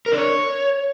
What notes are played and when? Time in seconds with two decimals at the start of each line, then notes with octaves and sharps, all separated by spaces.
0.06 A#4
0.12 D4
0.17 C#5